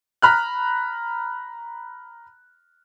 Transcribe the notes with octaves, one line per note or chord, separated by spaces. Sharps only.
A#5 B5 F6 F#6